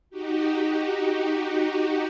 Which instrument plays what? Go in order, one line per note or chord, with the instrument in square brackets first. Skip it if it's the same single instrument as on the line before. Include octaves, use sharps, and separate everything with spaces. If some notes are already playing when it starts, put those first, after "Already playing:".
[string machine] D#4 F#4 G4